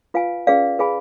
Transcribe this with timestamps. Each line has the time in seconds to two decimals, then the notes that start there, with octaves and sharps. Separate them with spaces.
0.14 F4 B4 F5 G#5
0.47 C#4 G#4 B4 D5 F5
0.79 G#4 B4 F5 G#5 B5